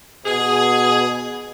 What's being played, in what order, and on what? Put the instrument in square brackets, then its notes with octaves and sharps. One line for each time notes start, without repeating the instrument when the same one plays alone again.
[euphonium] B2 [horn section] G#4